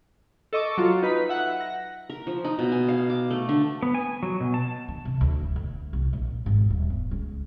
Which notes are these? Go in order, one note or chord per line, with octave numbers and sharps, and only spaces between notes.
A4 D#5 C#6 D6
F#3 F4
D#4 B4 B6
E5 F#5 F#6
A#6
A#4
F3
D#4
B2
G#5
F5
D6
A3
D3
B3
G#5
F#3
B2
A5
D3
C3
D2
E1
D2
C2
A#1
G#1
D#1
B3
C#2